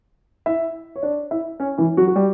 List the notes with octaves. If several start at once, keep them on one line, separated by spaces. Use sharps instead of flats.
E4 E5
C#5
D4 D5
E4 E5
C#4 C#5
E3 E4
F#3 F#4
F#4
G3 G4